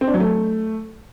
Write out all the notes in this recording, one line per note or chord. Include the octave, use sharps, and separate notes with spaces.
C4
D4
F#3
A3